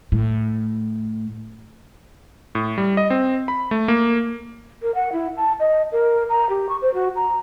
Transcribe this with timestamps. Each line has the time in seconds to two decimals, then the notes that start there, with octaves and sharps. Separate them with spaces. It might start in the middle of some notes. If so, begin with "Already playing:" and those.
0.12 A2
2.55 A2
2.78 G3
2.97 D#5
3.10 C4
3.48 B5
3.71 A3
3.88 A#3
4.82 A#4
4.95 F#5
5.13 E4
5.37 A5
5.60 D#5
5.92 A#4
6.29 A#5
6.49 G4
6.69 C#6
6.82 C5
6.94 F#4
7.16 A#5